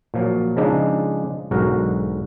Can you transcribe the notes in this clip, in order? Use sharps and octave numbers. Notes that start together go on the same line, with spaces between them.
A#2 F3 F#3
C#3 F3 G#3 D4 D#4
B1 G#2 D3 F#4 A#4